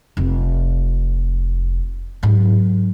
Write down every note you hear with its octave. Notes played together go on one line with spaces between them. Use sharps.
F1 F4
G#2 F#3